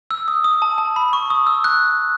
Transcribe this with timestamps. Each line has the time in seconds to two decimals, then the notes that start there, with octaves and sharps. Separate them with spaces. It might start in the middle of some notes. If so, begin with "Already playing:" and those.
0.11 E6
0.28 D#6
0.44 D#6
0.62 A5
0.78 A5
0.96 B5
1.13 C#6
1.30 D#6
1.47 E6
1.64 F#6